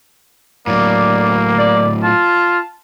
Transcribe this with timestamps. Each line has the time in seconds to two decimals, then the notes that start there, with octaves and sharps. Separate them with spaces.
0.67 A2 F#3 A#3 D5
1.59 D5
2.03 F4 A5